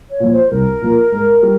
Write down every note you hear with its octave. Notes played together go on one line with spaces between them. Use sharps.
C#5
A#2 F3
C5
C2 A#4
A#2 F3
G#2
G3